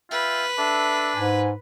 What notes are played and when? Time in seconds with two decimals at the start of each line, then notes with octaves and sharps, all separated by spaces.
0.11 F4 B4 E5 G5
0.58 D4 A4 E5
1.16 G#2 G#5